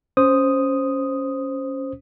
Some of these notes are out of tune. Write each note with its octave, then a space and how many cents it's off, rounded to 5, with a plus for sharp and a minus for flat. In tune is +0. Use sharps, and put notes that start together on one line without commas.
C#4 +0 C5 +0 D#6 +0